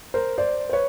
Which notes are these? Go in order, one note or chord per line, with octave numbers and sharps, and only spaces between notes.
A#4 C5
C5 D5
C5
B4 C#5